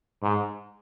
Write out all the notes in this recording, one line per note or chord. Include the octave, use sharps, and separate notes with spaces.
G#2